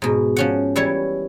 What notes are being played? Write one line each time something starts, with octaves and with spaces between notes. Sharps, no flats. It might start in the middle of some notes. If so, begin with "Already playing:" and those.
G#2 B2
F3 C#4 F#5
E3 G3 E4 C#5